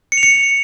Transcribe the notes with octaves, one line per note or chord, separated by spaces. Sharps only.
C#7
F7
C#7